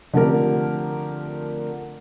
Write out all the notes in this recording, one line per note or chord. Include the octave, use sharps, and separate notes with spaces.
D3 F3 A3 C4 G4 A#4